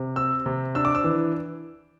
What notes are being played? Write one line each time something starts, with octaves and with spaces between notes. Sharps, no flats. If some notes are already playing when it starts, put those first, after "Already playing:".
Already playing: C3
C4 E6
C3
D4 E6
D6
E6
E3